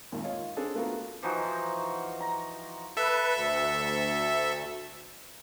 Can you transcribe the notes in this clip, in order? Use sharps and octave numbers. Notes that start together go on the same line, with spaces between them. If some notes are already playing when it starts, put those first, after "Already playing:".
G#1 D#2 A#2
F4 C#5 D#5
C4 D4 G#4 A4
A3 B3 F4 F#4 A#4
E3 F3 D#4 F#4
A#5
A4 B4 E5
D2